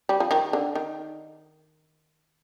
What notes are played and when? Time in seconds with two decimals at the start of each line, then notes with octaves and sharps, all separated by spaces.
0.09 G3
0.20 F3
0.31 D#3
0.53 D3
0.75 D#3